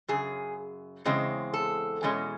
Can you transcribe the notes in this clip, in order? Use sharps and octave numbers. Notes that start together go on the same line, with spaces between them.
F#2 C#3 G#4
E2 C#3 G#3 C4
A4
E2 B2 G#3 C#4